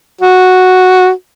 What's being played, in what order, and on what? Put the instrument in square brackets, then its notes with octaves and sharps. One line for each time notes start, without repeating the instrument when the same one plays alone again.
[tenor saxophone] F#4